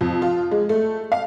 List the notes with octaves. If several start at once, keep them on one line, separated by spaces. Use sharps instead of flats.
F2
F4
G#3
A3
F5